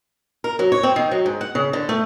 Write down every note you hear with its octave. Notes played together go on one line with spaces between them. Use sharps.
A#4
F#3
C#5
C4
D#3
F#3
G#2
F#5
C#3
D3
A3